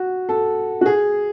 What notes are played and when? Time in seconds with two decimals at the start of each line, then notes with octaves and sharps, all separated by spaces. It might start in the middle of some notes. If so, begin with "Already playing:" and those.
Already playing: F#4
0.29 A4
0.81 F#4
0.86 G#4